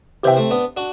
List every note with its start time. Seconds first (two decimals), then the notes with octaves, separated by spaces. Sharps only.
0.23 C3 E3 G4 C5 E5 G5
0.37 A3 C4
0.51 B3 D4
0.77 D4 F#4